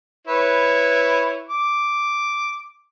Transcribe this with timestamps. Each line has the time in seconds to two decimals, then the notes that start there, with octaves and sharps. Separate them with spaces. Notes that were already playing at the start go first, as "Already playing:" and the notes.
0.27 E4 B4 C#5
1.49 D6